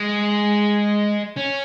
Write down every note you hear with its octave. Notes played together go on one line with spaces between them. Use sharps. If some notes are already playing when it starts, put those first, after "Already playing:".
Already playing: G#3
C#4